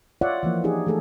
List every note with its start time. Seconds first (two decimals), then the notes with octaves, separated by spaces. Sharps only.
0.21 F4 C#5 D5 E5 F#5
0.43 E3 F3 A#3
0.64 D4 D#4 F4 G4 G#4
0.86 E3 A3 G#4 A4